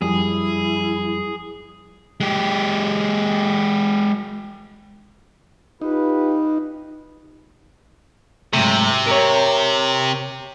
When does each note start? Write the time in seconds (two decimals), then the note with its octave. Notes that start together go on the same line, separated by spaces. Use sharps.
0.02 F#2 F3 G3 E4 G#4
2.20 G#3 G4
5.81 D#4 F4 G4 B4
8.53 G#2 C3 F#3 A3
9.07 A#4 C#5